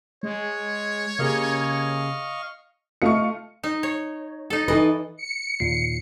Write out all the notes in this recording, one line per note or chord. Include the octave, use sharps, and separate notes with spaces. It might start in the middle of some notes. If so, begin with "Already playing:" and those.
G#3 C#5
C#3 A#3 G4 G#4 D#5 F5 C#6
A3 F4 D#5 F5 C#6 C#7
D#4
C#5
D#4 A4
E3 D#4 A4 B4 D#5
C#7
D#2 A#2 C7